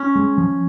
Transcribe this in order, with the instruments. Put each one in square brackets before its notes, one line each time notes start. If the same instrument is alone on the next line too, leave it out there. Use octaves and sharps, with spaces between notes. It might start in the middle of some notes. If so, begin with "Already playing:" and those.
Already playing: [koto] C#4
[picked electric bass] G#3
F3